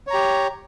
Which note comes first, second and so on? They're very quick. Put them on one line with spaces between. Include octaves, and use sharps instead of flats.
C#5 A#5 G4